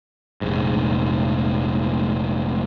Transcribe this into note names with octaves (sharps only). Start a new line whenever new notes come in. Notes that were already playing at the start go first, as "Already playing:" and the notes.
F1 A#1 G#2